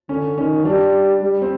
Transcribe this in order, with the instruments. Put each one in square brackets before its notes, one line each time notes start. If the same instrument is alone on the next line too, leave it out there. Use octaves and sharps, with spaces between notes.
[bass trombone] D3 [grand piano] C#4
[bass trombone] D#3 [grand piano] C#4
[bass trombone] G3 [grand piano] D4
[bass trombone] G3
[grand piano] C4